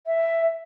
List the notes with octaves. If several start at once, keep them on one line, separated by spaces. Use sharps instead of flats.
E5